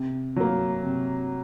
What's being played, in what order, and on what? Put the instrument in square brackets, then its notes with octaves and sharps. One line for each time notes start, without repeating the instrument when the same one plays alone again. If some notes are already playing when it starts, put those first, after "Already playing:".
Already playing: [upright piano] C3
F#3 A#3
C3